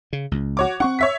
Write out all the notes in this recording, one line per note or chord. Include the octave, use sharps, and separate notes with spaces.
C#3
C#2
F#4 C#5 D6
C4 D4 F#5 C#6
C#5 E5 B6